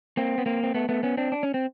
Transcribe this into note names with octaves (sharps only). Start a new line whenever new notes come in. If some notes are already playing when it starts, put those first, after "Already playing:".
A#3 C4
B3
A#3 C4
C4
A3 B3
A3 B3
B3 C#4
C4 D4
D4
C#4
C4